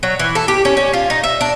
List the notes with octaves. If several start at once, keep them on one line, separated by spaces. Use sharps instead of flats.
F#3
E3
A4
G4
C#4
C#4
F4
D#4
E5
D4